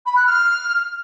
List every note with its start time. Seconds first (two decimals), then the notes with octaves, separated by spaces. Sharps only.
0.06 B5
0.16 F#6
0.26 F6